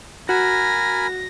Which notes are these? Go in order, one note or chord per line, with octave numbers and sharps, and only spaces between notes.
F#4 A#4 G#5 B5 A#6